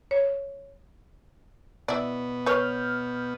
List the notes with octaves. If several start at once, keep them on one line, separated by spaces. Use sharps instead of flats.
C#5
B2 B3 E4 D5
B4 C#5 F6 G6